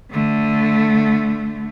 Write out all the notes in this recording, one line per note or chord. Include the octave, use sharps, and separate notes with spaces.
D3 A3